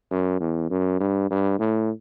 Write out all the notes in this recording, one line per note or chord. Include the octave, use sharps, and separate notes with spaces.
F#2
E2
F#2
G2
G2
A2